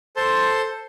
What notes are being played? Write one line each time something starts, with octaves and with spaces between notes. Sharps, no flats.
A4 C5 A5 C6